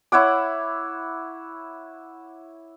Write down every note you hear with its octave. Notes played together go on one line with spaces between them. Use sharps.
E4 C#5 F#5 D6